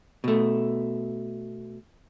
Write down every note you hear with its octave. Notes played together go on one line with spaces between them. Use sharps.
B2 A3